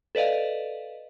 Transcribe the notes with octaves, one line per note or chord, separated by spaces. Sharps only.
A4 B4 D5 D#5 F5